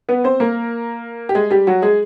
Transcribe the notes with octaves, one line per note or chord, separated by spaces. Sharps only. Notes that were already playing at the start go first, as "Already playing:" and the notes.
B3 B4
C4 C5
A#3 A#4
G4
G#3 G#4
G3 G4
F#3 F#4
G#3 G#4